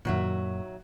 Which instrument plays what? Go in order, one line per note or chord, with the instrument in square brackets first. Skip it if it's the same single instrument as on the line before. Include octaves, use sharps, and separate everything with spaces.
[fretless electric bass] F#2 A#2 [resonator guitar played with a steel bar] D#3 F#3 E5